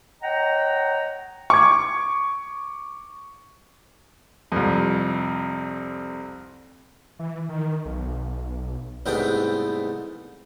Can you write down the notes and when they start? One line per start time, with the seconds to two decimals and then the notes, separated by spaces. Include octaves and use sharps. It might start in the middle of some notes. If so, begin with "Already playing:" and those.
0.22 C#5 D#5 F#5 G5 A#5
1.50 C#6 D6 G#6
4.52 C2 F2
7.19 E3
7.49 D#3
7.85 B1
9.06 C2 G#2 A3 B3 G5